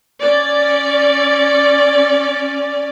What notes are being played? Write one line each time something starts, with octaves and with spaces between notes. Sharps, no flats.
C#4 D5